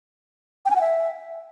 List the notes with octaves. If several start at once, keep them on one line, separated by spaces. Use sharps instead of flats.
G5
G#5
F#5
E5